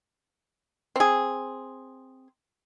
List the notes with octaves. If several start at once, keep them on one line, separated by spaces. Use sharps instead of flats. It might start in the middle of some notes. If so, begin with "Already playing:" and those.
C4 G#4